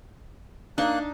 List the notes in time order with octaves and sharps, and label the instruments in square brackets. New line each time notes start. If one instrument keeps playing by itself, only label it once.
[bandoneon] A#3 F#6 [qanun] D4 [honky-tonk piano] D#4